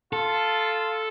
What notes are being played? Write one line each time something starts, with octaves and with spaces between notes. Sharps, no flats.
F4 A4